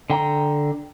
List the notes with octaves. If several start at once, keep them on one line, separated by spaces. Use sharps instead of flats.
D3 G5 A#5